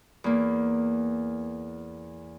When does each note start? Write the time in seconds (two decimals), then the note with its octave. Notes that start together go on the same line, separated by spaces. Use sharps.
0.24 E2 A#3